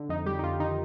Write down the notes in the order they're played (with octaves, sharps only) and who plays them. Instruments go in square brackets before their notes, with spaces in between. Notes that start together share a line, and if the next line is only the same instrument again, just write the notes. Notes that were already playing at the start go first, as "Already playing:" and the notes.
Already playing: [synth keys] D3
F2 D#4
G3 G4
D#4
F2 F4
D#3 D#4